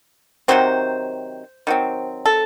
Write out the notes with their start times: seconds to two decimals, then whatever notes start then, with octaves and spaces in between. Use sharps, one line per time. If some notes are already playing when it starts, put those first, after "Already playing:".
0.48 C3 D#3 F#3 C4 C5
1.67 D#3 F#3 C4
2.26 A4